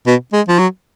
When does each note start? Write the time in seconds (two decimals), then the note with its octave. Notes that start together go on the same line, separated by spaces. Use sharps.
0.07 B2
0.33 G#3
0.48 F3
0.59 F#3